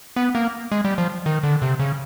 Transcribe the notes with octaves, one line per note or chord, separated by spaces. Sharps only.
B3
A#3
G#3
G3
F3
D#3
D3
C3
C#3